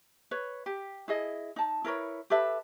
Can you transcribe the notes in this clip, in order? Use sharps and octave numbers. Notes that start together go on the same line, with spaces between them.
B4 C#5
G4
E4 G#4 D#5
D#4 A5
E4 A#4 B4 C#5
G4 A4 B4 E5